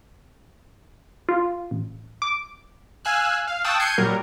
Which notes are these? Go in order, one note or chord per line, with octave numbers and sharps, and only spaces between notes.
F4
A1
D6
F5 G#5 E6 F#6
F5
G5 A5 C#6 D#6 E6 F#6
G6 G#6 C7 C#7 D#7
A#2 F#3 G3 A#4